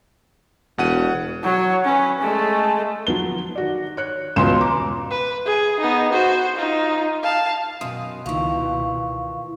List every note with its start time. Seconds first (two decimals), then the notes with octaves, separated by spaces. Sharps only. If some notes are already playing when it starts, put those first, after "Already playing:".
0.78 E1 B2 F#5 D#7
1.43 F#3 C#5
1.84 C#4 B4
2.19 G#3 A3
3.07 F3 F#3 B4 G7
3.55 D#3 F#4 D5
3.97 C#5 F#6 C#7
4.36 E1 C#2 B2 C#4 C6 E7
4.61 A#5 D6
5.11 B4
5.46 G#4
5.80 B3 D#4
6.12 F#4 C5
6.56 D#4 F4
7.23 F5 A5
7.81 F#2 B2 D#3 C6 D#6
8.26 C#2 A#2 D#3 E3 F5 C#6